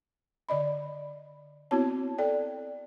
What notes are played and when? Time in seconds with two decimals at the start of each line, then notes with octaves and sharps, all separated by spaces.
0.49 D3 D5 D#5 B5
1.71 B3 C4 E4 F#4 C#5 A5
2.18 A4 D5 G5